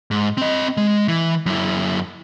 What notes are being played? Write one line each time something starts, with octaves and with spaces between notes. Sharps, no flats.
G#2
C4 D#5
G#3
E3
F#2 E4